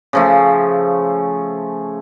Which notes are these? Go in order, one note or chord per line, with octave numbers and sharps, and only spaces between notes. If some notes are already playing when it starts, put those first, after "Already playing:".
C#3 F3 A3